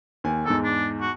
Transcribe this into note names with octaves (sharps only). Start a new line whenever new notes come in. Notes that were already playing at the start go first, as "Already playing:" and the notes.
D#2 G#5
E2 G#2 A4
D4
F#4